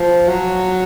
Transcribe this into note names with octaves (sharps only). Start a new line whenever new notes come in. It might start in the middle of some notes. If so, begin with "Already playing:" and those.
Already playing: F3
F#3